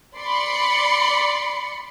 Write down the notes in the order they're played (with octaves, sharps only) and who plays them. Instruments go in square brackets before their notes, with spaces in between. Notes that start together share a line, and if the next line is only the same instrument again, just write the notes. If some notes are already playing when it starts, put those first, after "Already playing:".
[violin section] D5 B5 C6 C#7